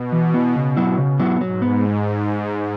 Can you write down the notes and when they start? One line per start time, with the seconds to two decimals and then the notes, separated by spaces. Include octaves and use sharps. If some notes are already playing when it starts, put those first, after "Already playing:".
Already playing: B2
0.13 E3
0.34 B3 E4
0.56 C#3
0.77 F#3 B3 E4
0.98 C#3
1.19 F#3 B3 E4
1.40 G#2 F#3
1.62 B3